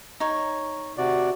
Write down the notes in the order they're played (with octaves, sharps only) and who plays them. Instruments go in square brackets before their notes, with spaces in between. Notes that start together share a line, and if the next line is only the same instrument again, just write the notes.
[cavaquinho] D#4 C#5
[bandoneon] C3 F#4 D5